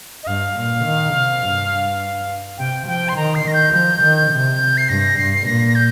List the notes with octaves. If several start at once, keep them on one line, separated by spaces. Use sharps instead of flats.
D#5
G2 F5
A#2
D#3
C3
G2
C3 G5
F3 G5
C6
D#3 A#5
C7
D#3 A#6
G6
F3 G6
D#3
C3
C7
G2 A#6
G2 C7
C7
A#2 A#6
A#6
G6